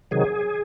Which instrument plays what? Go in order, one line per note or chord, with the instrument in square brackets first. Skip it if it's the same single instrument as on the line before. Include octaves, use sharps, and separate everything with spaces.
[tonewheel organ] C3 D#3 F#3 G#4